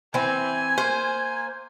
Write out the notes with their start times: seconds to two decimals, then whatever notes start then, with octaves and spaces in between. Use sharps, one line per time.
0.14 E3 C4 G#5
0.78 A#3 C5